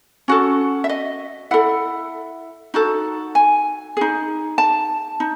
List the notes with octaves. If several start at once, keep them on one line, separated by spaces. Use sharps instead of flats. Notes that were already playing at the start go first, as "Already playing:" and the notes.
C#4 F#4 A4
E5
D#5
E4 A4 F#5
D#4 F#4 A4
G#5
D#4 G#4
A5
D#4